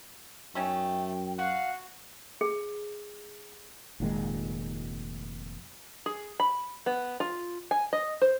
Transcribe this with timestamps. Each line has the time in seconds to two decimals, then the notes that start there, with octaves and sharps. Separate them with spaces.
0.55 F#2 A3 C#4 D#4 G5
1.39 F#4 F5 F#5
2.41 G#4
4.00 F1 A#2 D#3 G#3
6.06 G#4
6.40 B5
6.86 B3
7.20 F4
7.71 G#5
7.93 D#5
8.22 C5